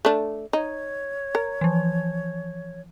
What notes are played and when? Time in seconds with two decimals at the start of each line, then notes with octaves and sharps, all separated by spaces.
0.05 A3 D4
0.53 D#4 C#5
1.35 A#4
1.61 E3 F3